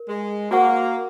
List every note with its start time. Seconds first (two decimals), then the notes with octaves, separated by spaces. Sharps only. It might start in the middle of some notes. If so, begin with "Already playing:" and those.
Already playing: A#4
0.09 G#3
0.51 A#3 F#4 C5 F#5 C#6